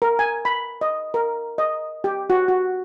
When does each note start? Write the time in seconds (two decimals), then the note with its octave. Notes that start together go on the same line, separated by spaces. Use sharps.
0.02 A#4
0.19 G#5
0.45 B5
0.81 D#5
1.14 A#4
1.58 D#5
2.04 G4
2.30 F#4
2.48 F#4